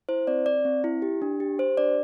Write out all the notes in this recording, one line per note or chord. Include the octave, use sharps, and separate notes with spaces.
E4 C5
C4 D5
C4 D5
C4
E4
G4
D4
G4
G4 C5
D4 D5